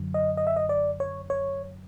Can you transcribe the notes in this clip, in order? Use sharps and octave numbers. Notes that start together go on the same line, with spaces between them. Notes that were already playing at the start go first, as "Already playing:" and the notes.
Already playing: F#2 D3 F#3
D#5
D#5
E5
D#5
D5
C#5
C#5